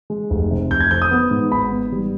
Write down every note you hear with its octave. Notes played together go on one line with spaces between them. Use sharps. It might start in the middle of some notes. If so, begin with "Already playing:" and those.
G#3
F1
C3
F1 G6
G#6
F2 G6
D#6
B3
G#2
G#1 B5
B3
G3